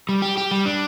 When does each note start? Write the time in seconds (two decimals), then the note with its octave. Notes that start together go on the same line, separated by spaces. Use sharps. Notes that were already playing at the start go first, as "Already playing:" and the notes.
0.09 G3
0.22 G4
0.37 G4
0.51 G3
0.66 D4